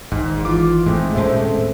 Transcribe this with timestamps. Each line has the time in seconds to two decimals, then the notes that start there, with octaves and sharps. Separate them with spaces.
0.12 G#1 G#2
0.45 E3 F4 D6
0.86 G#2 G#3 A3 C4
1.15 D#1 A2 C#4 A4 C5 E5